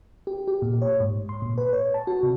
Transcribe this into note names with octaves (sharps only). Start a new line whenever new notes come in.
G4
G4
A#2
C#5
G#2
C6
A#2
B4
C#5
A5
F#4
C3